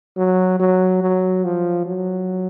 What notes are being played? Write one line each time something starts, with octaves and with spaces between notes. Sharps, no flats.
F#3
F#3
F#3
F3
F#3